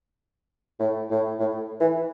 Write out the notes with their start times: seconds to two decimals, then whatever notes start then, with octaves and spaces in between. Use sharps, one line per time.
0.80 A2
1.10 A2
1.39 A2
1.80 E3